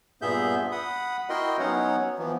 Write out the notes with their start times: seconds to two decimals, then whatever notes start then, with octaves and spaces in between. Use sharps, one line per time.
0.22 G2 A#2 B3 G#4 E5 G6
0.72 F#5 B5 D#6
1.29 E4 F#4 A#4 D#5 G5 C6
1.59 F#3 B3 C#4 D#4 C#5 F#5
2.19 E3 F3 B3